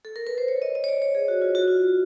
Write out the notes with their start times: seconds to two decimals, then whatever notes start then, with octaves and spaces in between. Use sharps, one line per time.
0.05 A4
0.16 A#4
0.27 B4
0.38 C5
0.48 C#5
0.62 D#5
0.75 D#5
0.84 C#5
0.88 D5
1.02 C#5
1.15 G#4
1.28 F#4
1.42 F4
1.55 F#4
1.68 F4